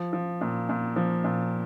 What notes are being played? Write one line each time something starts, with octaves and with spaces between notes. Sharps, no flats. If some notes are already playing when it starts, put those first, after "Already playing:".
Already playing: F3
F3
A#2
A#2
F3
A#2